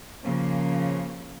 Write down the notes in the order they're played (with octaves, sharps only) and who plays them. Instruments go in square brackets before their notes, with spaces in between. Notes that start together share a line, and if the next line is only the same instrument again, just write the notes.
[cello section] C#3 F3 A#3